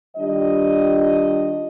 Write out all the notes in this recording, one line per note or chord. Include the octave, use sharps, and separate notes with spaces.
D#3 G3 D4 F4 D#5